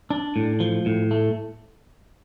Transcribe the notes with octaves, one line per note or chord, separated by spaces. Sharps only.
D4
A2
F3
A2
A3